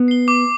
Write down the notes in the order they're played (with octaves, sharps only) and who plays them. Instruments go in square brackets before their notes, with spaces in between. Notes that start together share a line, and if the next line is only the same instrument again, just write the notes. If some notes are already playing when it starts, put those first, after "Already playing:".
Already playing: [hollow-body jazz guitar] B3
[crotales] C7 G7
D6